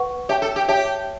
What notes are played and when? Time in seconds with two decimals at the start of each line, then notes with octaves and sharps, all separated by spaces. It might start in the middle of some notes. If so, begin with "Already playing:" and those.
Already playing: B4 F#5 C#6
0.29 G4 C#5 E5 A5
0.42 A4
0.56 G4
0.68 G4 C#5 E5 A5